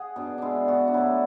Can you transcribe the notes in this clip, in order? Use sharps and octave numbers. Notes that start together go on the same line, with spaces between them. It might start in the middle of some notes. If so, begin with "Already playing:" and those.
Already playing: G#4 F#5
B2 D4
G#3 D4 E4
B2 F#4
D4
F#3 A3 E4